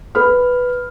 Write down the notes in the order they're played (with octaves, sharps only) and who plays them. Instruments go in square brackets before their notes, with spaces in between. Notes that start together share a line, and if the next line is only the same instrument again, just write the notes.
[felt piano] B4 B5 F6